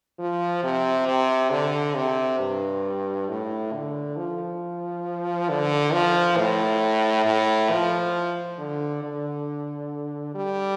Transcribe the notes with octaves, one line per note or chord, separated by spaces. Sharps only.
F3
C3
C3
D3
C3
G2
A2
D3
F3
D3
F3
A2
A2
F3
D3
D3
G3